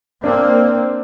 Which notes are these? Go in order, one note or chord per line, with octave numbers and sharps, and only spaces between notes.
A#3 C4 D4